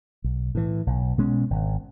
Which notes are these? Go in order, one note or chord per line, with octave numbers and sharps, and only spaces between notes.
B1
A2 E3
B1
B2 G#3 C#4
G#1